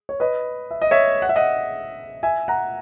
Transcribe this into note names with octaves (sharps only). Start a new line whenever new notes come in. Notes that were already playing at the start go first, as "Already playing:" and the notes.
C#5
B4 D#5
E5
D#5
C#5 E5
F#5
E5
D#5 F#5
E5 G#5
F#5 A#5